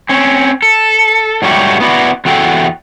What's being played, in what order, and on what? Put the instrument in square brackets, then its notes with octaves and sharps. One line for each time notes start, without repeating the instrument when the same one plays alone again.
[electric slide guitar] C4 C#4
A4
G#2 F#3 G3 A3 F#4 G4
B3 E4 F#4 D5
E2 F#4 A4 G5